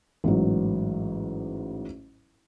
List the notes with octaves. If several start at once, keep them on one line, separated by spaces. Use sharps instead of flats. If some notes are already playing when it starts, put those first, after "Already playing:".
A1 G#2 F#3